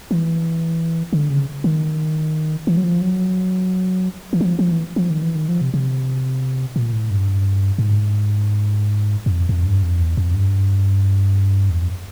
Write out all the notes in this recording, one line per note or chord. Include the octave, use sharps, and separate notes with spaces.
E3
D3
C#3
D#3
E3
F#3
F3
F#3
E3
F#3
F3
F3
E3
F3
D#3
E3
D#3
F3
C3
C3
A#2
A2
G2
G#2
F#2
F2
F2
G2
F2
E2
F2
G2
E2
F2